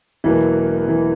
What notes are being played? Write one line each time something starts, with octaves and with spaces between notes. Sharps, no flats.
E1 E2 B2 E3 F#3 A#3
E3